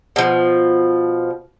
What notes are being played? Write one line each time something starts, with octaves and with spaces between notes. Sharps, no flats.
B2 F3